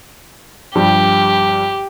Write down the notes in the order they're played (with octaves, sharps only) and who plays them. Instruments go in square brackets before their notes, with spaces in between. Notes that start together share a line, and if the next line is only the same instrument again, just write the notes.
[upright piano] G2 F3 G3 [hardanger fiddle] G4